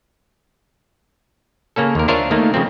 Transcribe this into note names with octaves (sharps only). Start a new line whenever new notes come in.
C#3 A#3 C#4 A4
D#2 A#4
D4 F4 A#4 C5 C#5 E5
D#3 A3 A#3 D#4
C#3 F3 C4